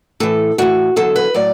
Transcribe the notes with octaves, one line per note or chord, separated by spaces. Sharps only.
A2 E3 A4
A2 E3 F#4
E2 D3 F#3 A4
B4
A2 F#3 D5